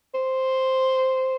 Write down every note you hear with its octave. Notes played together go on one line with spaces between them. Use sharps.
C5